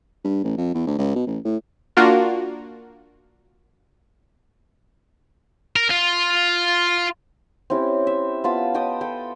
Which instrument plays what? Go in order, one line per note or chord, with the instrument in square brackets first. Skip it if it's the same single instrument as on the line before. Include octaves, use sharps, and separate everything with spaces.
[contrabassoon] G2
A1
F2
E2
D2
C#2
B2
A1
A2
[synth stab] A#3 D4 F4 F#4 A#4
[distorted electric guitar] A#4
F4
[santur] C4 C#4 E4 G4
E5
B3 F4 A5 B5
D#5 G5 D6 D#6
A4 G5 B5